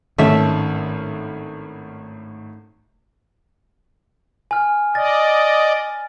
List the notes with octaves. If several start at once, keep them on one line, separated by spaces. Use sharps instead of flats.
G#1 A2 D#3 A3 C#4 E5
G#5 F6
D5 D#5 A6